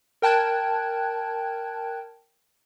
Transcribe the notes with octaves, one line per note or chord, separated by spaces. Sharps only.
A#4 G5 A5 F#6 G#6